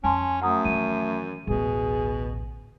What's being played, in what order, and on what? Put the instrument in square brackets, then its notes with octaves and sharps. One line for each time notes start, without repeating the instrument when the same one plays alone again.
[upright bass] F2 [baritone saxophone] C#4 [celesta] G#5 A5 C6
[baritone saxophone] F#2 [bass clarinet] A3 [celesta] F#5 A#5 D#6
[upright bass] D#3 E3 [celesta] D#7
[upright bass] A1 D2 [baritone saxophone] B2 [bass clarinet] G#4